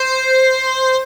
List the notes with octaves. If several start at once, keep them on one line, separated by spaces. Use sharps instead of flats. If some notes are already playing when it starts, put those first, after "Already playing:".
Already playing: C5